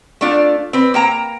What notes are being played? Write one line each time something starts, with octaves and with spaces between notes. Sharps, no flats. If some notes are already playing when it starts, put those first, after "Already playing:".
A3 D4 F4
C4 B4
A#3 G5 A#5